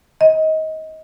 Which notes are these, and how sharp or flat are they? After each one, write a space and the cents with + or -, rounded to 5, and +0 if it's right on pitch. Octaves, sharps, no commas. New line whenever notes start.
D#5 +25